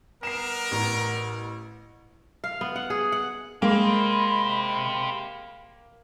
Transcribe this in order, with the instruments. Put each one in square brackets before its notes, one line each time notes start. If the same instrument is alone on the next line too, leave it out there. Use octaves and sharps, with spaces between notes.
[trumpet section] G3 B3 A#4 [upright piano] C7 E7
[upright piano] A1
[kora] F5
B3
F#5
G#4
F#5
[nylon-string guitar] G#3 [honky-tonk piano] A#3 [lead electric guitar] G4 C5 [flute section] D#5 B5